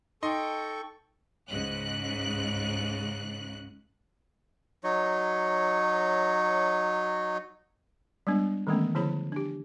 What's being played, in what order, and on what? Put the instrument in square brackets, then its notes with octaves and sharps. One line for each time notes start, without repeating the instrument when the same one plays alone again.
[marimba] D#4 [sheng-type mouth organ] A4 C#6 [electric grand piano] D#5 C6 [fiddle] G5
[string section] C#2 G#2 C#3 F#6
[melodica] F#3 D#4 C#5
[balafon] G3 G#3 B3 D4
D#3 E3 G#3 A3 B3 C#4
D3 F3 E4 G#4 C#5 B5
D4 G4